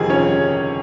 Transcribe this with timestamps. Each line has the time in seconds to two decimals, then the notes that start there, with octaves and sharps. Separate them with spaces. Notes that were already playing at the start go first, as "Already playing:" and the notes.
Already playing: G1 F2 C3 D#3 G#4 G#5
0.10 C#4 C#5